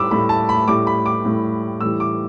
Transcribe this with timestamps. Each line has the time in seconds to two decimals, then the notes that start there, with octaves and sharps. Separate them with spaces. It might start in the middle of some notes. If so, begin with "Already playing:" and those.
Already playing: A2 G3 B5 D6 E6
0.11 A2 G3 B5
0.29 A5
0.49 B5
0.68 A2 G3 D6
0.87 B5
1.06 D6
1.25 A2 G3
1.81 A2 E3 G3 E6
2.00 D6